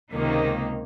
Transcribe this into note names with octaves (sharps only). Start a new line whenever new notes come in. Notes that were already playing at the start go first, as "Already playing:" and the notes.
C#2 C3 D#3 A#3 D#4